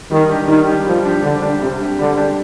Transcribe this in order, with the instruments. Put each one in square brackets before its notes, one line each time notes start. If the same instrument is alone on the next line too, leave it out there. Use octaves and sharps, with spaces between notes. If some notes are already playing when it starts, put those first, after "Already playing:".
[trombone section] D#3 [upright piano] G3
[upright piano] D4 G4
[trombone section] D#3 [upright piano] G3
[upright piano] D4 G4
[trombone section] F3 [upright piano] G3
[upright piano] D4 G4
[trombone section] D3 [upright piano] G3
[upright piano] D4 G4
[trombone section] C3 [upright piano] G3
[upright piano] D4 G4
[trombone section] D3 [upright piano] G3
[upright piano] D4 G4